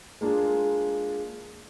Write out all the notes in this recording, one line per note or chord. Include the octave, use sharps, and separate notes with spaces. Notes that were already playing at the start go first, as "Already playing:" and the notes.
G#3 A#3 D4 F4 G#4